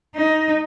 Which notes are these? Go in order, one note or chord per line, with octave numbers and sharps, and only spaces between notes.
D#4